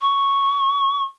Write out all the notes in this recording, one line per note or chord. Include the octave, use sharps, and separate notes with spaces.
C#6